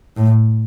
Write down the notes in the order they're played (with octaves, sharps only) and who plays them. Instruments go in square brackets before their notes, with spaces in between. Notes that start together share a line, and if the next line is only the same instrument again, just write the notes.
[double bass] A2